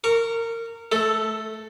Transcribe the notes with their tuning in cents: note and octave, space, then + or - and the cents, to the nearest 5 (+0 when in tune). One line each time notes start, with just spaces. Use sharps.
A#4 -20 C#6 +0
A3 -15 A4 +5